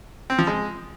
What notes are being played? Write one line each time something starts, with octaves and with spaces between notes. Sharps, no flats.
C4
F3
G#3